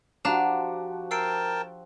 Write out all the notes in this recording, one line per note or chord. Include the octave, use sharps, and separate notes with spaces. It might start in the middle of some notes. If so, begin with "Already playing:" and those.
F3 D4 F#4 G4 F5 A#5 E7
A#4 G5 A5 E6 C7 D7